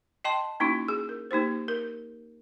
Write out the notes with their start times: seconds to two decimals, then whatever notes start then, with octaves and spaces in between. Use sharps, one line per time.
0.24 D#5 G5 A5 C6
0.60 A#3 C#4 D#4 E4 F#4
0.88 G#4
1.09 A#4
1.31 A#3 D#4 G4 C5
1.68 A#4